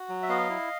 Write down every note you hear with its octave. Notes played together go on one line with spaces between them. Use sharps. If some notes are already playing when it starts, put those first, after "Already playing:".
Already playing: F#4
F#3
E5
B3 D#5 F5
E4